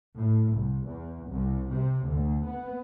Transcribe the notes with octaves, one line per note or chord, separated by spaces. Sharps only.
A2
C2
E2
C2
C3
D2
B3